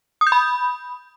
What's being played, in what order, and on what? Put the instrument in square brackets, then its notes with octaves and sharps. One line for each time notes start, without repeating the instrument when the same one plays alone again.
[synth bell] D#6
G6
B5